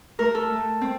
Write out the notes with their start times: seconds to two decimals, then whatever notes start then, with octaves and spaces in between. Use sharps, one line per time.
0.19 A3 A#4
0.35 A4
0.50 A3
0.81 C4